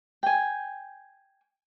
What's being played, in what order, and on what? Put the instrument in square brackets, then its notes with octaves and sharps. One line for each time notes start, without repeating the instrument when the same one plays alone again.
[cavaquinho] G5 G#5